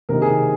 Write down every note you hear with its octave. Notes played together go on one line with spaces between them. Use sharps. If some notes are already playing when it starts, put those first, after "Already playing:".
C3 D#3 A#3 D#4 A#4
G#4